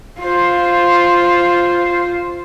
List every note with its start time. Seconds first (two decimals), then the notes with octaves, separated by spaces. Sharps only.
0.19 F4 C5